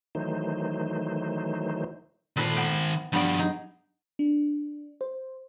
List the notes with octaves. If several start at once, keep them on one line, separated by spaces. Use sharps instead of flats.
D#3 E3 F#3 A3 D#4 C5
A#2 D#3 A4 B4 C5
B3 G5 G#5
G2 F3 G3 B3 D5
D#4 G#4
D4
C5